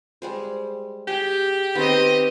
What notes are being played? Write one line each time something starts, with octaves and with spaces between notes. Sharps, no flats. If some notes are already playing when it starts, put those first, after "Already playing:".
G3 G#3 C5
G4 G#4
D#3 B3 C4 B4 D#5